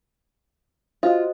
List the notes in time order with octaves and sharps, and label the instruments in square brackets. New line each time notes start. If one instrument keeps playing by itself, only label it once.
[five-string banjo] F4 [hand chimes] F#4 C5 D#5